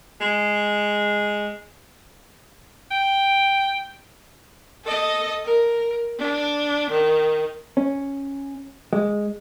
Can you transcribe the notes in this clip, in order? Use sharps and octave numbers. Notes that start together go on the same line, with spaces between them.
G#3
G5
A4 D#5
A#4
D4
D#3
C#4
G#3